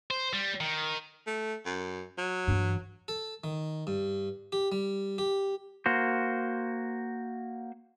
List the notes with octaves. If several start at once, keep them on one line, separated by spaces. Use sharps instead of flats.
C5
G3
D#3
A3
F#2
F#3
G2 E3
A4
D#3
G2
G4
G3
G4
A#3 F#4 C5